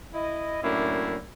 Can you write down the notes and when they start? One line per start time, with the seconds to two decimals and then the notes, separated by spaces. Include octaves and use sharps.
0.13 E4 D#5
0.62 F#2 A2 A#3 D4 E4